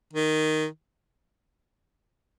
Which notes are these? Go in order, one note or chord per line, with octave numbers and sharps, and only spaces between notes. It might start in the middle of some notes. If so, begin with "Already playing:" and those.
D#3